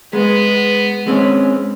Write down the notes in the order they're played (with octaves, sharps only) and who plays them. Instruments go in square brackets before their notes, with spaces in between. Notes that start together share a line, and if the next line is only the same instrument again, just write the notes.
[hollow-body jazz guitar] G#3 [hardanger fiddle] B3
[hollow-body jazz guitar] G#3 C4 C#4